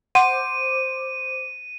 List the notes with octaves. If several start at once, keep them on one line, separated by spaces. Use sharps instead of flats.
C5 F#5 D6 D#7